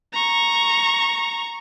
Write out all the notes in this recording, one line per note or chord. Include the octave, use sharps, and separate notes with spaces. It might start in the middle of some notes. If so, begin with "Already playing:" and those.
A#5 C#6